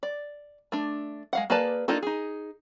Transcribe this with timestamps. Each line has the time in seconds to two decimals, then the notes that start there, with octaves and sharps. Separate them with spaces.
0.03 D5
0.72 A3 D4
1.33 G#3 F5 F#5
1.50 A#3 G#4 B4 D5 A5
1.88 A#3 D4 D#4 F4 A4
2.02 D#4 G#4